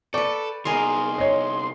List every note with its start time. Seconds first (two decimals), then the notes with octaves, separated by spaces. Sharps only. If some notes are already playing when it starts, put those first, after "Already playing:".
0.14 A4 B4 D5 G5 C#6 D6
0.65 C3 B3 D#4 G#4 A#4 C6
1.18 C#5 D#5